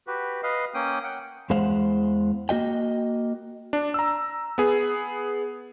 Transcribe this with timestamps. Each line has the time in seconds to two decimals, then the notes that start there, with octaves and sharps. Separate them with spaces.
0.07 F#4 G4 B4
0.43 B4 D#5 F5
0.74 A#3 C#4 G5 D#6
1.04 F#5 G5
1.50 E2 E3 G#3 C5 F5 F#5
2.49 A#3 F#4 D#5 G5
3.73 D4
3.94 A#5 E6
4.58 B3 G#4